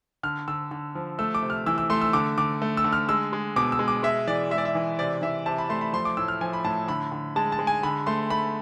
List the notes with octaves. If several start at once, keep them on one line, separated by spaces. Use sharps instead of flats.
D3 F6
D3 E6
D3
F3
A3 E6
D6
C3
F6
E3 E6
E6
A3 C6
E6
D3 D6
D3 D6
A3
E6
D3
F6
G#3 E6
G#3
B2 D6
E6
G#3
D6
G#3 E5
E3 D5
G#3 E5
D5
E5
E3
C3 D5
E3 E5
C3 A5
B5
A3 C6
B5
F3 C6
D6
A2 E6
F6
F3 G#5
B5
A2 A5
D3 B5
D3
G#3 A5
A5
G#3
G#5
D3 B5
A3 C6
A3 B5